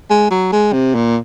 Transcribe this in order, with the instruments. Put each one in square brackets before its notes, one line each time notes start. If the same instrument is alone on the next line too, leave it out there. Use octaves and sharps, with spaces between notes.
[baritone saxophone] G#3
F#3
G#3
C3
A#2